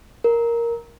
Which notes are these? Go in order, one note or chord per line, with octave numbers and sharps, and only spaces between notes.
A#4